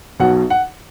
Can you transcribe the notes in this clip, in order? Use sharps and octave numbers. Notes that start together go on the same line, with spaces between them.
B1 B2 F#3 F#5
F#5